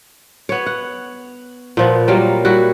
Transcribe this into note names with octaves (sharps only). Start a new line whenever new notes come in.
B3 C#5
F#5
A#2 F3 B3
F#3 G3 A#3 F4
G3 E4 F#4